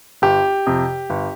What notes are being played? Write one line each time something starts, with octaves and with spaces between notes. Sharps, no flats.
G1 G4
F2 C3
G1